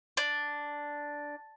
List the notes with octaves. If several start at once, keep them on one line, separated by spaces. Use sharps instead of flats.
D4